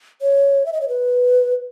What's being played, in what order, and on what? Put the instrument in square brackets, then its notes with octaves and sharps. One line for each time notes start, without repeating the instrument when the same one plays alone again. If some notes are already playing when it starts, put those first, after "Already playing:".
[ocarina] C#5
E5
D#5
C#5
B4